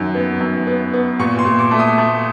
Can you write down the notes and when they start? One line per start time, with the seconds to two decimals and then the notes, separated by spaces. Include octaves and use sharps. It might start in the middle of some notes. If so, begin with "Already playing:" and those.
Already playing: F#2 D#3
0.15 B3
0.41 F#2
0.67 B3
0.94 B3
1.19 A#2 C#6
1.38 C6
1.45 A#2
1.59 D6
1.71 A3
1.79 D#6
1.98 A3